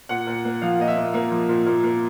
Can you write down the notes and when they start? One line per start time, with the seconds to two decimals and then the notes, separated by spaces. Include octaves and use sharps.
0.09 A#2 F#5
0.27 A#2
0.45 A#3
0.62 F3 F5
0.80 A#2 D#5
0.88 E5
0.97 A#2
1.14 A#3
1.31 F3
1.49 A#2
1.67 A#2
1.84 A#3